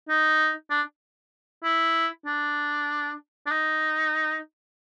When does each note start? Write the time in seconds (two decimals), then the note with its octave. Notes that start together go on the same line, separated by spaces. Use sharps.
0.09 D#4
0.70 D4
1.64 E4
2.26 D4
3.47 D4
3.51 D#4